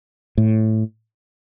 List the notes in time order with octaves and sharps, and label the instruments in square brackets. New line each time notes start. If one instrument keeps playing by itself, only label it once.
[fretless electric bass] A2